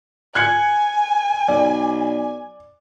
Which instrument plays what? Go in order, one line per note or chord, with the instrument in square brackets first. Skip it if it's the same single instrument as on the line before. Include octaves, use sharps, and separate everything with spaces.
[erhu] G#5 [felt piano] F#6 G#6 C#7
[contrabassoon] B1 [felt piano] D5